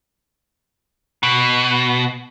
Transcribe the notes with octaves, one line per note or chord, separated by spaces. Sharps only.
B2